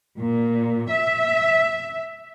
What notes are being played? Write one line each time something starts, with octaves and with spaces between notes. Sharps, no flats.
A#2
E5